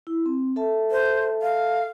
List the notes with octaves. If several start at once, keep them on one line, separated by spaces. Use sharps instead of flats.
E4
C4
A4 E5 A5
C5
F5